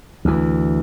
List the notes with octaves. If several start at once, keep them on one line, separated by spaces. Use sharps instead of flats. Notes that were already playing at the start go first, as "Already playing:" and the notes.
D2 E3